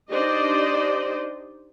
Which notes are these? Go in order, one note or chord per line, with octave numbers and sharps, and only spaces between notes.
D4 D#4 G4 C5 D5 D#5